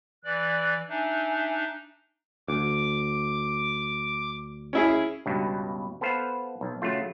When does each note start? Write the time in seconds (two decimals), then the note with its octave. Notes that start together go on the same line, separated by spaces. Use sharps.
0.25 E3 D5 F#6
0.89 D4 D#4 E5 G#5
2.48 D2 D6
4.73 C#4 E4 G#4
5.26 C#2 G2 B2
6.01 B3 A4 B4 C5 F5
6.61 B1
6.82 C#3 F#3 A3 F4